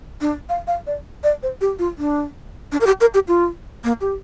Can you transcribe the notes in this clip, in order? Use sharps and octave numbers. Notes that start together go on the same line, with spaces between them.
D4
F5
F5
D5
D5
C5
G4
F4
D4
D4
A#4
G4
A#4
G4
F4
A#3
G4